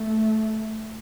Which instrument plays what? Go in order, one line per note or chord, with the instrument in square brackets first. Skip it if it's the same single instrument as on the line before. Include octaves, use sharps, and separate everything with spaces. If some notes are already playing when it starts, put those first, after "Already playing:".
Already playing: [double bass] A3